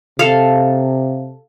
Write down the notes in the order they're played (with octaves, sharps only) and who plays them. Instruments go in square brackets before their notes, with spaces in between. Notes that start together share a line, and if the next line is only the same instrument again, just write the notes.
[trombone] C3 [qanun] A4 F5